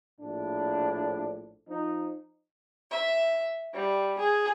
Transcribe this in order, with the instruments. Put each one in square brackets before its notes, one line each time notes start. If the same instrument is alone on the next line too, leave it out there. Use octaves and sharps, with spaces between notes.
[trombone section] A#1 A2 D4
F3 D#4
[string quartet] E5
G3
G#4